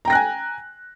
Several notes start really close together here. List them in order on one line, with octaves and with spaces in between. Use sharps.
A#5 G5 A#6 F#6 G#5